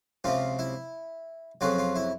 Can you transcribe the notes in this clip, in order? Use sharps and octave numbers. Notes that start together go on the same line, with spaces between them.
C#2 C3 F3 F4
E4
F2 C#3 F#3 F4
F4
E4